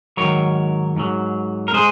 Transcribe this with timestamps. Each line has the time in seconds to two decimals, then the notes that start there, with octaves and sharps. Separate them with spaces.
0.17 G#2 D#3 F#3 A#4 C#5
0.96 G#2 F#3
1.68 A#4
1.74 G#3 G#4 C5